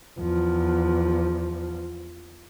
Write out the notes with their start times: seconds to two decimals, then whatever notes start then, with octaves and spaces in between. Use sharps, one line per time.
0.18 E2 F3